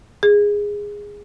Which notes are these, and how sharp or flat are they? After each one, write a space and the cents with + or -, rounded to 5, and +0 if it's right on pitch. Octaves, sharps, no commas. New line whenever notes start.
G#4 -10